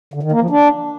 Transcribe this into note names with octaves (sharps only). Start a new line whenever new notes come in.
D3
D#3
A#3
F3
D4